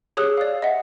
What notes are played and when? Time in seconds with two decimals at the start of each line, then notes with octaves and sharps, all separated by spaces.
0.17 G4 G#4 C#5 D#6 E6 F#6
0.37 D5 F5
0.62 D#5 E5 F#5